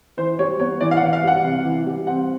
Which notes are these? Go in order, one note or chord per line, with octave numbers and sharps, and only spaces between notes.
E3 C5
G3 C#5
B3 C#5
E3 D5
F5
F#5
E3
F5
G3 F#5
C3
E3
G3
C4 F#5